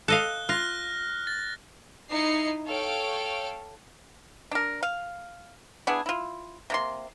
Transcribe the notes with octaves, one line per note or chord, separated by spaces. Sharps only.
A4 D#5 F5 F#6 G7
F4 F6 F#6 A#6
A6
D#4 E4 C7 C#7
A4 C#5 F5 G5 D7
D4 A#4
F5
B3 D4 E4 G#4
E4 F4
C3 A#3 C6